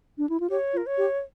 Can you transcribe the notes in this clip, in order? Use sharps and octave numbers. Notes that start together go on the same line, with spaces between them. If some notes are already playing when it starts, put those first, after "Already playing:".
D4
E4
F4
G4 C#5
F4
A#4
C#5
G4